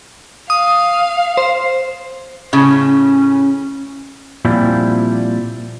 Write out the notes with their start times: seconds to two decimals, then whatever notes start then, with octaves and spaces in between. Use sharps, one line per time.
0.50 F5 D#6
1.37 C5
2.53 A2 C#3 C#4
4.45 A#2 F3 G3 C4 E4